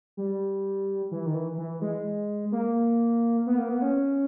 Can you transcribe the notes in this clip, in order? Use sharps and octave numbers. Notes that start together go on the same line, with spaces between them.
G3
E3
D#3
E3
E3
G#3
A#3
B3
A#3
B3
C#4